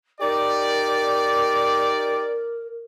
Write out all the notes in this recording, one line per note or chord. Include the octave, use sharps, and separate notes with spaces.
D#4 G4 A#4 D5